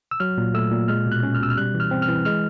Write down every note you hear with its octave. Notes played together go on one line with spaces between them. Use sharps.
E6
F#3 F6
A#2
A3 E6
A#2
G#3 F6
B2
F#6
C#4
F6
B2 E6
F6
G3 F#6
E3
F6
C4
F6
E3
G#3 F6